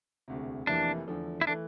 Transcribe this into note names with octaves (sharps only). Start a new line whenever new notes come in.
E1 D2 C3
F1 F2 E3 A#3 D4 E4
E2 D3 F3 A3
E4
E3 A3 D4